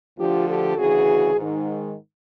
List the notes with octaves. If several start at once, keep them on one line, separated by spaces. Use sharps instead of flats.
D2 D3 F3 F4 G4
G4 A4
D2 C#3 E3 F#4 G#4
G#2 D#3